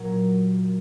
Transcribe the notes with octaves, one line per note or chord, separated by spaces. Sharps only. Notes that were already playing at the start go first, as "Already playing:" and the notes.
Already playing: A#2 F#3 A#4